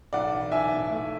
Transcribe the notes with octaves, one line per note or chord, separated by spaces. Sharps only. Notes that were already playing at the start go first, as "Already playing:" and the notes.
B1 D5 F#5
E3
B1 E5 G#5
B1
A3